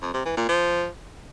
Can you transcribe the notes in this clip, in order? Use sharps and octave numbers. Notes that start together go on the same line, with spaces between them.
F2
C3
E3
A#2
F3